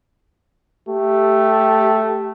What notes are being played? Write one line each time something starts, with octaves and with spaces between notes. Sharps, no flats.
A3 G4